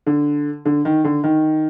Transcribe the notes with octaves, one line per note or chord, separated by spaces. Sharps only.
D3
D3
D#3
D3
D#3